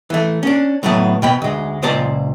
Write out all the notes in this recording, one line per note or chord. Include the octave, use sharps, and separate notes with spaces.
E3 A3
C#4 D4
A2 F#3 A3 B3 A5
B2 G5 B5
D2 G#3
C#2 A#2 C5 D5 A5